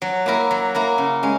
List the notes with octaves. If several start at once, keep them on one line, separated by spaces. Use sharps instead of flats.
F#3
A#3 E4 A#4
F#3
A#3 E4 A#4
C#3
G#3 C#4